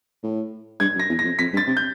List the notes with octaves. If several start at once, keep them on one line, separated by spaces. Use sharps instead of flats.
A2
G2 G#6
F#2
A#6
E2
A#6
F2
F2 B6
G2
A6
C3
G6